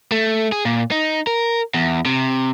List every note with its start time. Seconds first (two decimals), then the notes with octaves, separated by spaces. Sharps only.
0.12 A3
0.52 G#4
0.65 A#2
0.91 D#4
1.27 A#4
1.74 E2
2.05 C3